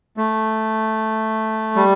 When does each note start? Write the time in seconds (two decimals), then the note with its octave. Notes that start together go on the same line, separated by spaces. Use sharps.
0.17 A3
1.76 G3